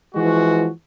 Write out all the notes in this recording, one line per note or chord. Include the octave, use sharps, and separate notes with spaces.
E3 F3 G#3 F#4